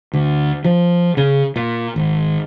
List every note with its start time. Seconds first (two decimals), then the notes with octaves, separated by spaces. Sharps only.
0.13 D2
0.65 F3
1.17 C#3
1.56 A#2
1.96 G#1